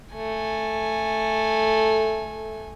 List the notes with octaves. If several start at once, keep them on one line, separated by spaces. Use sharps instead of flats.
A3 G#5